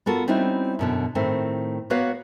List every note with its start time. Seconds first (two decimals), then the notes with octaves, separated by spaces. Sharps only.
0.06 B3 F4 F#4 A4 A#4
0.28 G3 C4 C#4 D#4 E4 F#4
0.79 F#2 B2 D3
1.15 A2 D#3 A3 C4
1.90 A#3 B3 F#4 B4 C#5 F5